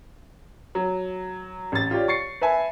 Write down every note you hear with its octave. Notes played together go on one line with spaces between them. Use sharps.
F#3
A1 A6
F4 G4 C#5 D5
C#6 A6 C7 C#7
B4 E5 G#5 A5